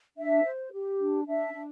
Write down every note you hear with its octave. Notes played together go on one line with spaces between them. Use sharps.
D4 E5
C5
G4
D4
D4 E5
D4